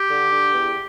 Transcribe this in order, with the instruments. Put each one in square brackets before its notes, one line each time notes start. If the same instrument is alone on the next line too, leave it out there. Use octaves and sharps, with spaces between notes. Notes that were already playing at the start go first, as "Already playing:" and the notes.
Already playing: [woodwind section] G4
D3
D3
E2